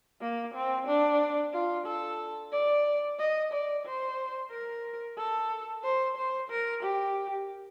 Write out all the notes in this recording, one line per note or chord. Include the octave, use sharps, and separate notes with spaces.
A#3
C4
D4
F4
A4
D5
D#5
D5
C5
A#4
A4
C5
C5
A#4
G4